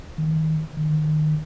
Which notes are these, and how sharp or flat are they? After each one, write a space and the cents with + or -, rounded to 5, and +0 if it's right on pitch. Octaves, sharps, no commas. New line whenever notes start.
D#3 +25
D#3 -25